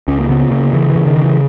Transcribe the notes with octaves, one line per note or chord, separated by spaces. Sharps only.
C#2 C#4
A#3
C#3 B3
C#3 A#3
C#3 E3
E3
C#3
D#3
C#3
E3